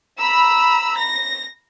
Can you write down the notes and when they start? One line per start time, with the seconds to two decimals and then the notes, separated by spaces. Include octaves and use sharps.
0.19 A#5 B5 E6
0.96 A#6